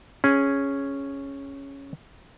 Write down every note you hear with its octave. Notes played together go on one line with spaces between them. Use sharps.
C#4 G#4